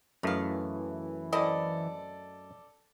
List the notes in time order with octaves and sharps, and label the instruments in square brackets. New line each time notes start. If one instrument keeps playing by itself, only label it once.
[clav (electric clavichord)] F#2 A3 [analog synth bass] E3 [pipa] D#4 F5
[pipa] C4 E4 D#5 [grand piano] A4 D5